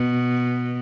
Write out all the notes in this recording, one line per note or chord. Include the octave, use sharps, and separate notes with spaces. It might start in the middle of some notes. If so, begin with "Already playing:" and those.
Already playing: B2